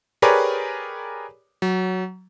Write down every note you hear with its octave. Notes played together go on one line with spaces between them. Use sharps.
G4 G#4 A#4 B4 C#5 D5
F#3